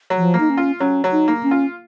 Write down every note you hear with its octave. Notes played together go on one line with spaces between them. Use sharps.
F#3
F3
A#3
D#4
C#4
F4
F#3 C#4
F#3
D#4
A#3
C#4
F4